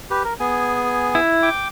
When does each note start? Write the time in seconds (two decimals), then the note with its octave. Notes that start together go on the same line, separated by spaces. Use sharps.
0.11 G4 B4
0.24 A#4
0.40 B3 G#4 G#5
1.15 E4
1.43 G5 D6